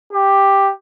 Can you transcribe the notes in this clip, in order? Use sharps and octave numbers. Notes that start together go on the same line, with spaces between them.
G4